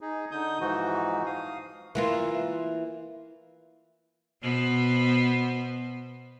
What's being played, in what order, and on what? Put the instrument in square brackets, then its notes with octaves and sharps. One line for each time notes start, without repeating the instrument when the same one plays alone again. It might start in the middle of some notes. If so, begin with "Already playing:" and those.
[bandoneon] D#4 G#4
D3 D#4 D#6 G6
G#2 E3 F3 D#4 F#4
F5 D#6
[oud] E3 A#3 F4
[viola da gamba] B2 B3 C5